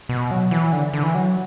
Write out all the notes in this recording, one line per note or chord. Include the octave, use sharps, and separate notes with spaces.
B2
F#3
E3
D3
D3
E3
F#3